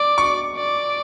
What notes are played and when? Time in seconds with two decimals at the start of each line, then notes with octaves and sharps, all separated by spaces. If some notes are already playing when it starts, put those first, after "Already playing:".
Already playing: D5 D6
0.18 C#6
0.56 D5